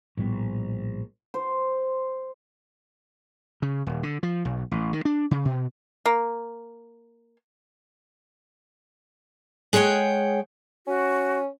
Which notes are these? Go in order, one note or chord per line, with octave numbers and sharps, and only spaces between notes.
A#1 A2 G3 B3
C5
C#3
D#1
D3
F3
B1
A1
D#3
D4
C#3
B2
A#3
G#3 G#4 C#5 F#5 G5
C#4 F#4